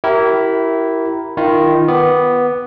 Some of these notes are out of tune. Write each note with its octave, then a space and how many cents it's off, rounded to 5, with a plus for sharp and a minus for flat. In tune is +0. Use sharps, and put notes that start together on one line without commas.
E4 +0 G4 -35 A#4 +0
D#3 +0 F4 -30
B3 +0 D6 +0